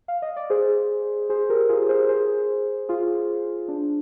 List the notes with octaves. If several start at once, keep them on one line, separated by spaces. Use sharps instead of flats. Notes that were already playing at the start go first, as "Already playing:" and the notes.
F5
D#5
D5
G#4 C5
G#4 C5
G4 A#4
F4 G#4
G#4 C5
G#4 C5
F4 G#4
D4